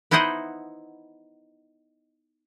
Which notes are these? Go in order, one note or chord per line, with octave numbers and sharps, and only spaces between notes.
B3 D#4 E4 C5 D#5 F#5